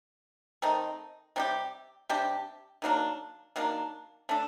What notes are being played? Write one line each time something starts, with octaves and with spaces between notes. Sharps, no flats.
D#3 A3 C4 D#4
C3 G3 D4 G4
C3 G3 D4 G4
D#3 F#3 A#3 D4
D#3 F#3 A#3 D4
D3 A3 D4 A4